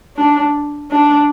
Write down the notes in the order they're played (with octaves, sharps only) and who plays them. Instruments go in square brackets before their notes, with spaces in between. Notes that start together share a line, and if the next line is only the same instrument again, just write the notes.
[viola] D4
D4